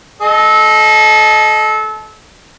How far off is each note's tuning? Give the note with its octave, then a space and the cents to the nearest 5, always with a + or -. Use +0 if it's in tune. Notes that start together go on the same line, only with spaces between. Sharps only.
A4 -25 D#5 +0